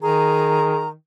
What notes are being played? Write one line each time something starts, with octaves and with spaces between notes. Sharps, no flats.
D#3 G#4 A#5